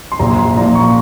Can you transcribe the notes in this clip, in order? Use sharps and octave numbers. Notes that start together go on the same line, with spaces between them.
C6
A#1 A#5
C6
A#2 F3 A#5
C#6